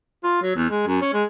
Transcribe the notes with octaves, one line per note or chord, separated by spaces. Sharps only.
F4
F#3
E2
G#3
F#2
C#4
G#3